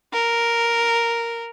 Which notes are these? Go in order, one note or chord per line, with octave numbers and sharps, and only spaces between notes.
A#4